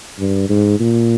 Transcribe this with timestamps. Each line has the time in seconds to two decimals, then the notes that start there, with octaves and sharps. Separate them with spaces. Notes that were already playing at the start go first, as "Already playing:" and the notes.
0.19 G2
0.50 G#2
0.80 A#2